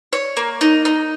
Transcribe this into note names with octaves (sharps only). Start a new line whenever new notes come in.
C#5
A#3
D#4
D#4